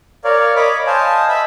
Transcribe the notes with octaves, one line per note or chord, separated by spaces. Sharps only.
A#4 C#5 D5 F5
C#5 D#5 B5 D6
C5 D#5 F5 G#5 A5
D#5 E5 B5 E6